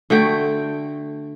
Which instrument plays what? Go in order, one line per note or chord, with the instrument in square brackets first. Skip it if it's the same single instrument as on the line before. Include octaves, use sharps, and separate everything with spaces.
[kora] D3 A3 F#4 G5